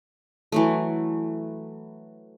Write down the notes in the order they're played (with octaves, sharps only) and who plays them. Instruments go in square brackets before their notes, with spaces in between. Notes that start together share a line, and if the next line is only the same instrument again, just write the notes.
[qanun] E3 F#3 A3